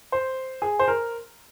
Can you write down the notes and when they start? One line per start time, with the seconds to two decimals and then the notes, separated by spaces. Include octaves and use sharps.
0.12 C5
0.62 G#4
0.79 C5
0.88 A#4